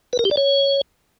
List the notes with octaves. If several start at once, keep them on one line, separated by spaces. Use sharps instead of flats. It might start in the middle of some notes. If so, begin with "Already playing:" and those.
B4
A#4
G4
D5
C#5